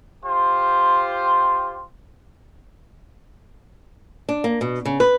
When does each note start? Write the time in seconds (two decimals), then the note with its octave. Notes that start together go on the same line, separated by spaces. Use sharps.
0.24 F4 G4 C5
4.29 D4
4.44 A#3
4.61 B2
4.85 C#3
5.00 B4